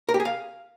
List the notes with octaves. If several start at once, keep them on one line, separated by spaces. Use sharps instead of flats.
A#4
G4
G#4
F5